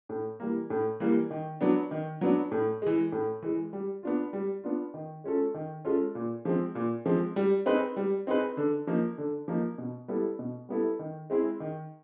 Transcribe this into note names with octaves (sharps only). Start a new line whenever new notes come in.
A2
E3 G3 A#3
A2
E3 G3 A#3
D#3
F#3 B3 D4
D#3
F#3 B3 D4
A2
E3 G#3
A2
E3 G#3
G3
B3 D4 F4
G3
B3 D4 F4
D#3
G#3 C#4 F4 A4
D#3
G#3 C#4 F4 A4
A#2
F3 G#3 C4
A#2
F3 G#3 C4
G3
C4 D#4 G#4 B4
G3
C4 D#4 G#4 B4
D3
F3 A#3 D#4
D3
F3 A#3 D#4
B2
G3 B3 E4 A4
B2
G3 B3 E4 A4
D#3
G#3 C4 E4 G#4
D#3